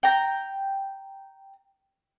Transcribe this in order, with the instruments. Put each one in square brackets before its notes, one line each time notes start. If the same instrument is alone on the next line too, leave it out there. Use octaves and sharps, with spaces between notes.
[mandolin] G5 A#5